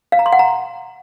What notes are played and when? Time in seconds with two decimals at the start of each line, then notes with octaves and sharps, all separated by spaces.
0.12 F5
0.19 A#5
0.26 C6
0.33 F#5
0.39 A#5